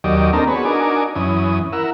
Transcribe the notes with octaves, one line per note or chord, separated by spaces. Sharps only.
D#2 F#3 G4 D5 D#5
A#3 C4 D4 D#4 A4 A#5
B3 F#4 G#4 B4 C#5
D4 D#4 F#4 A#4 G#5 D6
F#2 E3 C#4 D#6
E4 A#4 F#5 E6